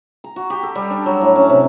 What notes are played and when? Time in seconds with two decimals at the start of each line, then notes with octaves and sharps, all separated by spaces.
0.24 A#5
0.36 F#4
0.50 G4
0.63 A4
0.75 G3
0.91 D4
1.06 F#3
1.21 A2
1.36 C#4
1.50 C3